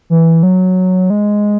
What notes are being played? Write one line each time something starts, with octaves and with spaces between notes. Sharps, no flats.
E3
F#3
G#3